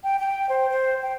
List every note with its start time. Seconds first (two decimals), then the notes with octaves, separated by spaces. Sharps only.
0.04 G5
0.19 G5
0.49 C5
0.70 C5
1.03 G5